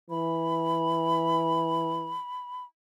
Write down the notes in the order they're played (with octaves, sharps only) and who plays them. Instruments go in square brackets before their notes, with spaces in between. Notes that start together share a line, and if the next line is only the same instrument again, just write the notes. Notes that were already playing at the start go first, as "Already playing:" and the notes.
[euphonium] E3 [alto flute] B5